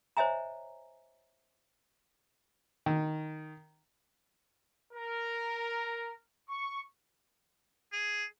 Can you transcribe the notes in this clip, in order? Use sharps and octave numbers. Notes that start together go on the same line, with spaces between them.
C5 C#5 D#5 E5 G#5 A#5
D#3
A#4
C#6
G#4